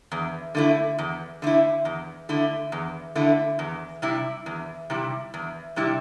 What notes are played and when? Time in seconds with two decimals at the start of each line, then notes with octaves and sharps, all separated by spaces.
0.12 E2
0.55 D3 A3 E4
0.99 E2
1.42 D3 A3 E4
1.85 E2
2.29 D3 A3 E4
2.72 E2
3.15 D3 A3 E4
3.59 E2
4.02 C3 G3 E4
4.46 E2
4.90 C3 G3 E4
5.34 E2
5.76 C3 G3 E4